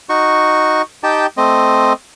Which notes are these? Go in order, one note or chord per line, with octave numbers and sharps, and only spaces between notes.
D#4 F#4 C#6
D#4 G4 G5 A5
A3 C4 D#5